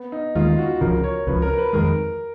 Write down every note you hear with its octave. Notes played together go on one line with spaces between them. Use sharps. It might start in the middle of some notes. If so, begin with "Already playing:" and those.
Already playing: B3
D#4
D#2 D#3 G#3 F4
F#4
C#2 C#3 F3 A#4
C#5
C#2 C#3 F3 B4
A#4
B4
F2 D#3 G#3 A#4